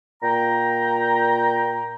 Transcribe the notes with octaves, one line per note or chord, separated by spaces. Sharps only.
A#2 G5 A#5